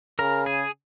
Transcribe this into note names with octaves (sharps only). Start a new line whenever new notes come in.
C#3 A#4 A#5
G#4 G#5